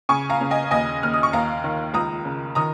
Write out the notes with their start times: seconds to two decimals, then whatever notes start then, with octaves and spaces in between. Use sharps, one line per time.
0.09 C#3 G#5 C#6
0.30 F5 A#5
0.41 C#3
0.51 D#5 G#5
0.71 D#2 D#5 G#5
1.03 D#2 F6
1.13 D#6
1.23 C#6
1.33 D#2 F5 A#5
1.64 D#3
1.94 C#2 A#5 D#6
2.25 C#3
2.55 D#3 A#5 D#6